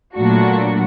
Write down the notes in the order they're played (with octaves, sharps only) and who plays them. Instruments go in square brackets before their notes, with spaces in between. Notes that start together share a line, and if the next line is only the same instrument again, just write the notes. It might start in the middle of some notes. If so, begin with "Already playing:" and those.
[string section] A#2 F#3 A3 D4 F#4